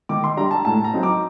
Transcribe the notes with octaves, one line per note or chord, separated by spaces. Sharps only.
D#3 D6
C6
G3 D4 A#5
A5
A2 A5
A#5
F#3 C4 D#4
D6